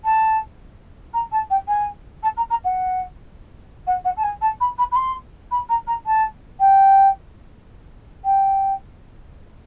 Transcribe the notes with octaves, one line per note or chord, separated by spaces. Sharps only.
A5
A#5
A5
G5
G#5
A5
A#5
A#5
F#5
F#5
F#5
A5
G#5
A5
B5
B5
B5
C6
B5
A#5
A#5
A5
G5
G5